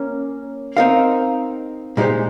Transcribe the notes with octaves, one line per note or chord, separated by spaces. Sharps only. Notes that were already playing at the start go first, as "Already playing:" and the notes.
Already playing: A#3 C#4 A#4
C4 D#4 A#4 F5
A#2 G#3 D#4 G4 C5